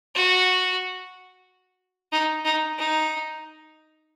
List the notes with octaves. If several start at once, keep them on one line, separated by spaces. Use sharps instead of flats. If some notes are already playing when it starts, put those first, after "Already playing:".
F#4
D#4
D#4
D#4